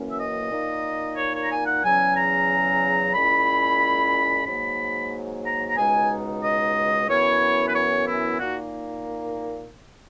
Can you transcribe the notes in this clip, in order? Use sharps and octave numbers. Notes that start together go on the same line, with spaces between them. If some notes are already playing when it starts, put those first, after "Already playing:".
Already playing: F#2 E3 A#3 C#4
E5
D#5
A#2 A#3 D#4
C#5
C#5
A#5
G#5
F#5
E2 C#3 F#3 C#4 G#5
A#5
A#2 G#3 C#4 E4 B5
G#2 F#3 A#3 B5
A#5
A#5
C#2 B2 G#3 D#4 G#5
D#5
F#2 E3 B3 E4 C#5
B4
C#5
E4
A#2 A#3 D#4 F#4